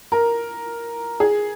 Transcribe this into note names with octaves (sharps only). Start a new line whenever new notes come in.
A#4
G#4